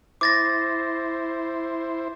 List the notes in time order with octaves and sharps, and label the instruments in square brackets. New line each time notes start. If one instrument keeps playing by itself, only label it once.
[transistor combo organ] E4 C5 [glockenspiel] D6 A6 A#6